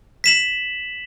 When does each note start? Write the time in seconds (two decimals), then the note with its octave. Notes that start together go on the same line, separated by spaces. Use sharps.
0.24 B6 E7 F#7